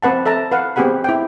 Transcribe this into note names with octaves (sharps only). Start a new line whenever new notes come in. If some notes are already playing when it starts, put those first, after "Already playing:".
C4 B4 F#5 A5
A4 E5 A5 A#5
B4 F5 F#5
B3 C4 G4 G#4 F#5 B5
E4 G5